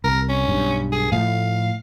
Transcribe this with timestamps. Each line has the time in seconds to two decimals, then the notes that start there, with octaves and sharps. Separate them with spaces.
0.04 C2 A#4
0.29 C#4
0.48 B1 G2
0.92 G#4
1.12 A2 F3 A3 F5